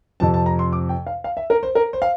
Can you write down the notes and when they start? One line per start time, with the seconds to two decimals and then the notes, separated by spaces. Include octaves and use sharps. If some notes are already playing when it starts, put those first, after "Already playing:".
0.20 F2 C3 F3 A5
0.34 A5
0.46 A#5
0.59 C6
0.73 D6
0.89 G5
1.07 F5
1.24 F5
1.37 E5
1.50 A#4
1.63 C5
1.75 A#4
1.93 C5
2.02 F5